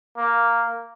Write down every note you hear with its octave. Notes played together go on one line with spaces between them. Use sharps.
A#3